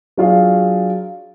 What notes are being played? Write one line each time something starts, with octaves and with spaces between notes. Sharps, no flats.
F#3 D4 F4 G#4 F5